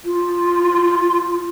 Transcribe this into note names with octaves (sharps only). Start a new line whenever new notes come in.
F4